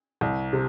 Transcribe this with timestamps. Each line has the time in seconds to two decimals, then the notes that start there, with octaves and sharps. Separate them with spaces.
0.21 C2
0.53 C3